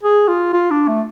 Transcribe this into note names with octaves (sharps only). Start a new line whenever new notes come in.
G#4
F4
F4
D4
A3